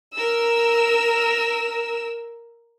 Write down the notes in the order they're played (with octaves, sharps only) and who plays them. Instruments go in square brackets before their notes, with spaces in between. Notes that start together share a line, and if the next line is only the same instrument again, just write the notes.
[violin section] A#4 E6